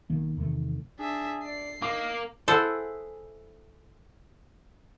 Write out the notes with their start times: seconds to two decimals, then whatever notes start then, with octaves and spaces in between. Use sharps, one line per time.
0.10 B1 D#3 A#3
0.37 E2 C3 D#3 A3
0.99 D4 G#4 E5
1.44 D5 C7
1.82 A#3 D#4 D6
2.48 E4 G#4 A4 C5 F#5